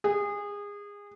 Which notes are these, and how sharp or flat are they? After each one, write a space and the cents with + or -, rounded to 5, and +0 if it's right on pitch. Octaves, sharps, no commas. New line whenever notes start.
G#4 -25